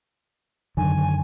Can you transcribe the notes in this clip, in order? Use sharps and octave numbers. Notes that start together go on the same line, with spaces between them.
F#2 D3 D#3 G#5